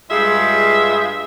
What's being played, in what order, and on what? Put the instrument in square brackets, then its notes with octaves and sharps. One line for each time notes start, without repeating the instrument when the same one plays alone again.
[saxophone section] G2 G#3 F4 G#4 E5